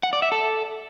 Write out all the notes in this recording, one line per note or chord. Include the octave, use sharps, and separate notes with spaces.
F#5
D5
E5
A4